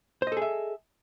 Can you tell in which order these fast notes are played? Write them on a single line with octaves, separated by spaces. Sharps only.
C5 D#5 A4 G#4 E5